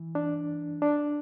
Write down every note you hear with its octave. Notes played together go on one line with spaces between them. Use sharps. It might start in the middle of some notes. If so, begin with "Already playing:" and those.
Already playing: E3
D4
D4